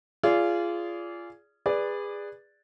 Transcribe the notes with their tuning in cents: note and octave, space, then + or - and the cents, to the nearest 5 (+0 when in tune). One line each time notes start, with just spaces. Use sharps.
F4 -20 G#4 +0 D5 -25
G#4 -25 B4 +0 D5 +0